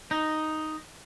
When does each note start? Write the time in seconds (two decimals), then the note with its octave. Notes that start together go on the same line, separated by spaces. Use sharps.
0.11 D#4